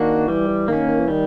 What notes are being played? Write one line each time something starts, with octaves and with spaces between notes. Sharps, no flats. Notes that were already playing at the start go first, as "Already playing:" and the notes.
Already playing: D#3 A#3 D4 F#4
E3 G3
E3
D#3 A#3 C#4
D#3
E3
D#3 G3